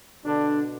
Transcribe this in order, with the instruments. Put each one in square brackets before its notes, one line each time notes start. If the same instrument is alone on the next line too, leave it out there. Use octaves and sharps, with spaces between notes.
[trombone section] B2 D3 D4